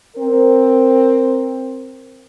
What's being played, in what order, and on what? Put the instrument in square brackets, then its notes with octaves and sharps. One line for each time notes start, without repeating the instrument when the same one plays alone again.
[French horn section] C4 A#4